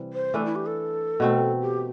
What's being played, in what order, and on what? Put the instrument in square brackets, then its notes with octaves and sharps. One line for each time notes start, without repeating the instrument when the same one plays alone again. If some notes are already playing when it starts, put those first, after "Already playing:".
Already playing: [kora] C3 E3 G3 C4
[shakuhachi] C5
[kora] E3 A3 D4 [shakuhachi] A4
[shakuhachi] E4
G4
A4
[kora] B2 A3 C4
[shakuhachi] G4